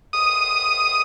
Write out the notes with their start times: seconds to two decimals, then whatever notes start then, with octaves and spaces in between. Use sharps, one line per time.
0.13 D#6